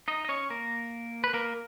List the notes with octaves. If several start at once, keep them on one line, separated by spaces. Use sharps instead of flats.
D#4 D#5
D#5
C#4 C#5
A#3 A#4
B4
A#3 A#4